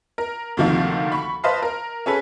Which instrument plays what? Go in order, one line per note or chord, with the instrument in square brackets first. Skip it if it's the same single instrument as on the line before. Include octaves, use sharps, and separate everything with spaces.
[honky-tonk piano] A#4
D2 C3 D#3 F3 A#3
B5 C#6
B4 C5 D#5 F5 A5
A#4
C#4 G#4 A4 B4